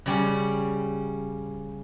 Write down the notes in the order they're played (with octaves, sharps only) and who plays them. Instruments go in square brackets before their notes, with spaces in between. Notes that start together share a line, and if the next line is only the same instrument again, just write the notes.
[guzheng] C#3 G3 C#4